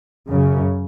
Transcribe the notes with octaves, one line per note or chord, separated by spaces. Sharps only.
F#2 C#3